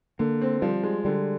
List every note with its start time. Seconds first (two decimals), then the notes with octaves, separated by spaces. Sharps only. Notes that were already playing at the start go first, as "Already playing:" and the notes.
0.19 D3 A#3
0.41 C4
0.62 F3 G3
0.83 G#3
1.05 D3 G3